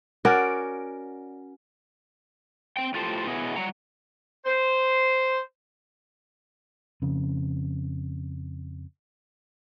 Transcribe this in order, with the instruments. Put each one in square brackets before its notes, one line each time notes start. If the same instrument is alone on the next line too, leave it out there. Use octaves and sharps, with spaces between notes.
[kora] C#4 F#4 A#4 D5
[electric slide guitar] C4 G5
A2 F4 G4 A4 C5
B2 B3 E4 G#4 C#5 D#5
F#3 G3 C#5 F#5 A#5
[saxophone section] C5
[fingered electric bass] F2 C#3